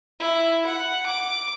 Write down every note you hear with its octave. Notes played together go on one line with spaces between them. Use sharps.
E4
F#5
D6